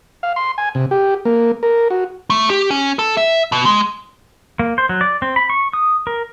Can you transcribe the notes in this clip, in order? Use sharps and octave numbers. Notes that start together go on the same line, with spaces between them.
F5
C6
G#5
C3
G4
A#3
A#4
F#4
A3
G4
C#4
A4
E5
B2
G#3
A#3
C5
F#3
D5
C4
B5
C#6
D#6
A#4